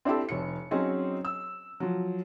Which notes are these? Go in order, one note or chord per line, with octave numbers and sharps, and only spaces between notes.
C4 D4 E4 G4 A4
F1 C#5 C#7
F#3 C4 C#4 D#4 G#4
E6
F3 F#3